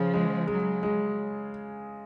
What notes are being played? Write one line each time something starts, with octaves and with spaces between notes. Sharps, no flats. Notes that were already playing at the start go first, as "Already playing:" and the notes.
Already playing: C#3 F3
G#3
F#3 G#3
G#3